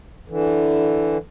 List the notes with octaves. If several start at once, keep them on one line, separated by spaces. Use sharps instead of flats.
D3 E3